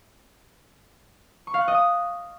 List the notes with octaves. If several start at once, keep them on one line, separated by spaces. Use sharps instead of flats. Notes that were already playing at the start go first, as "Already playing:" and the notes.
C#6
F5
F#6
D#5
D#6